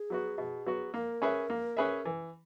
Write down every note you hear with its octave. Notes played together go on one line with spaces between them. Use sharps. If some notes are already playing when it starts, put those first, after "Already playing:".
Already playing: G#4
F#3 B3 F#4
B2
F#3 B3 F#4
A#3 A#4
C#4 G#4 B4 E5
A#3
C#4 G#4 B4 E5
E3